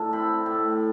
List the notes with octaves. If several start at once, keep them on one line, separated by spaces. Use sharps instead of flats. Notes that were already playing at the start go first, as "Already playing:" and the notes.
Already playing: A2 D5 A5
C4 B5
A2